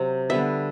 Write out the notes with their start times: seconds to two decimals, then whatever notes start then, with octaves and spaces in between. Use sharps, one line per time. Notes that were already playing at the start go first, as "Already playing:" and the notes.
Already playing: C3 F#3 C4
0.30 D3 G3 B3 E5